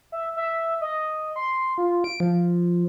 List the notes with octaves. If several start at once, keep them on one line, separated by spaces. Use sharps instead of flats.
E5
E5
D#5
C6
F4
D7
F3